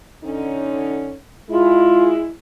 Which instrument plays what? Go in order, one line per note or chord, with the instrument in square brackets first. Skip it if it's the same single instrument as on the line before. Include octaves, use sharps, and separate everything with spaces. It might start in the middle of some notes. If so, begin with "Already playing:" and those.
[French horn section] D3 C#4 D#4
[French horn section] G#3 E4 [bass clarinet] F4